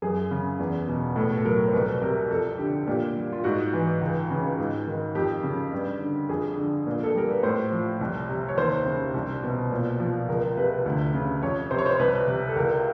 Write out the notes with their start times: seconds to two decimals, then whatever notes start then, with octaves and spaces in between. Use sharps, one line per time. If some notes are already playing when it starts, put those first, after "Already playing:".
0.02 F#2 G#4
0.31 C#3
0.59 E2
0.88 B2
1.16 A2 A4
1.37 A4
1.44 F#3 A#4
1.68 C5
1.73 C2 B4
2.01 C3 A#4
2.31 F2 A4
2.58 D3 G4
2.87 A#2 G4
3.16 G3
3.32 F4
3.44 G#2 F#4
3.73 E3
4.01 C#2
4.30 C#3
4.58 G#2
4.86 D#3
5.15 F2 G4
5.43 C#3
5.73 G2
6.00 D3
6.29 F2 G#4
6.57 D3
6.87 A#2
7.03 A4
7.15 G3 A#4
7.31 B4
7.43 A2 C5
7.72 F3
8.01 C2
8.29 C3
8.48 C#5
8.57 D#2 C5
8.86 C#3
9.14 C2
9.43 B2
9.72 A#2
10.00 F3
10.28 C#2 A#4
10.57 C3 B4
10.86 D2
11.14 C#3
11.42 F2 C#5
11.71 C3 C5
11.78 C#5
11.86 C5
11.99 C2 B4
12.27 C3
12.49 A4
12.56 C#2 A#4